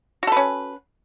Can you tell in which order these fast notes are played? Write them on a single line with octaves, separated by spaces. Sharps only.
F#4 A4 B4 C#4